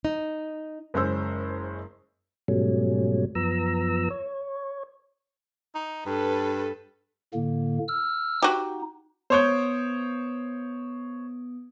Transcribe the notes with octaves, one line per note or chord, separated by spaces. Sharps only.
D#4
F#1 G#3 C#4 C5 E6
G#2 B2 F#3 G3 A3 C#4
F#2 F3 B3 A#5 E6
C#5
D#4
G2 A4 B4
A2 D3 A#3
E6 F6
D#4 F#4 G4
B3 C5 C#5 D#6 G6 D7